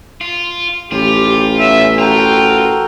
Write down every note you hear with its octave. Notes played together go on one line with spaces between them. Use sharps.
F4
A1 F4 G4
B3 C#4 E5
F4 F#4 A4 A#4 G5